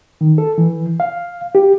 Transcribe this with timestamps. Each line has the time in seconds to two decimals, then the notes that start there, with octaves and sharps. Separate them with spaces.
0.21 D#3
0.38 A4
0.58 E3
1.00 F5
1.55 G4